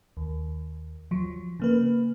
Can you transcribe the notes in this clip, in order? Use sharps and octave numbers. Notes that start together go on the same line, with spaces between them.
D#2
F3 F#3
C#3 A#3 B4